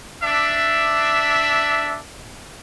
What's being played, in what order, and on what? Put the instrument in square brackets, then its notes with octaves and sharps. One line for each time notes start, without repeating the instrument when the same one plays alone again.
[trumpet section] D4 E5